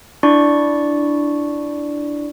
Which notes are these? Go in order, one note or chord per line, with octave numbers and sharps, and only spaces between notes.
D4 E4 D5 C#6